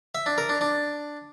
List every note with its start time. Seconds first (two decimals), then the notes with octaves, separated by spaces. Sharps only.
0.15 E5
0.26 D4
0.38 A#4
0.49 D4
0.61 D4